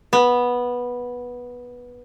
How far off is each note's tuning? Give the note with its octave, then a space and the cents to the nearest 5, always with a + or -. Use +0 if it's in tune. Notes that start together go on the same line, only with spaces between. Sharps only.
B3 -10